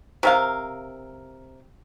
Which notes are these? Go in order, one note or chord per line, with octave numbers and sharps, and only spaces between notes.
C3 A#4 F5